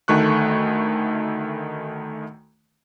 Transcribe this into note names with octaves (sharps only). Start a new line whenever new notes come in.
D2 D#3 A3 C#6 F#6